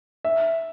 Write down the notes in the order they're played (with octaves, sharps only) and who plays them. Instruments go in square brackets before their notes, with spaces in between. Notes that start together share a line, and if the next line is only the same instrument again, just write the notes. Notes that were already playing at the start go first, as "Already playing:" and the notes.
[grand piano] E5